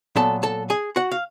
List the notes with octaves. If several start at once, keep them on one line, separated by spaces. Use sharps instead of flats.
A#2 F#3 B3 A4 A5
A4 A5
G#4 G#5
F#4 F#5
F5